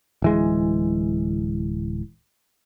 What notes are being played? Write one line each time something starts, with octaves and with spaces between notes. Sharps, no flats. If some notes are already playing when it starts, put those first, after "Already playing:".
D1 E3 G#3